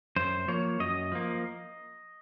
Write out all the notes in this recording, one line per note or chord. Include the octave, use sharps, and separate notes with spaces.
F#2 C5
F3 A#3 C#5
F#2 D#5
F3 A#3